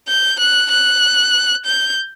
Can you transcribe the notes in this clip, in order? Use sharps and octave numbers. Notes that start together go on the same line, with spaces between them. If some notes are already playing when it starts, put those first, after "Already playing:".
G6
F#6
F#6
G6